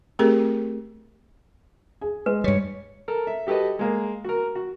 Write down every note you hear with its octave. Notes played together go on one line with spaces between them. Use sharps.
A3 C4 G4 G#4 A#4
G#4
G#3 B4
G2 G3 C#5
A4 A#4
E5
F#4 G4 A4 B4 D#5
G#3 A#3
F#4 A#4
F#4